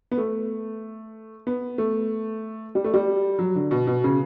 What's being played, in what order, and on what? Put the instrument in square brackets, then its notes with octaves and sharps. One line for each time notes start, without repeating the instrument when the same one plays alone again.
[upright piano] B3
A3
B3
A3
G3
A3
G3
F#3
D3
B2
B2
C#3